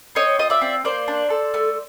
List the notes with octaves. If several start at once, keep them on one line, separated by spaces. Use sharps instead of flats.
C4 C#5 D#5
F4 D#5
D5 E5
C4
A#3 C5 D5
D4
A4
A3